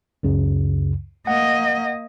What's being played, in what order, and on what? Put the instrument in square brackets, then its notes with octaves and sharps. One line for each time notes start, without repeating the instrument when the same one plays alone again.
[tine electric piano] C#2 F#2 C#3
[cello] A#3 D#5 [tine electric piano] F#5